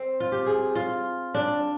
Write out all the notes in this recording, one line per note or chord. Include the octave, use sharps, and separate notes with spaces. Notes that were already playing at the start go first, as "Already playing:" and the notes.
Already playing: C4
F4
G4
G#4
F4
D4